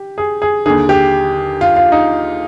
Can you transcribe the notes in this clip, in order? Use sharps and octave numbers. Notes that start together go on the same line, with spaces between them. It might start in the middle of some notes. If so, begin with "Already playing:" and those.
Already playing: G4
G#4
G#4
D#2 D3 G#4
G4
F4
F4
D#4